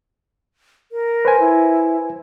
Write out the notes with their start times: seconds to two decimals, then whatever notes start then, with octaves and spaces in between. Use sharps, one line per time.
0.92 A#4
1.25 B4 C5 G#5
1.40 E4